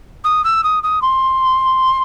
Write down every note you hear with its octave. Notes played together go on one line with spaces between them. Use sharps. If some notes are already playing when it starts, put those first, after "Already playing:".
D#6
E6
D#6
D#6
C6